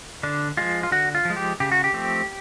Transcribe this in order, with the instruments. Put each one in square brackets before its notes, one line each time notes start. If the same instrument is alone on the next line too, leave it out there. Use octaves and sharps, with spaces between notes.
[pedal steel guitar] D3 D4
F3 G#3 F4
F4
D3 F#4
F4
F3 G#3
G4
C#3 G4
F#4
G4
F3 A3 C4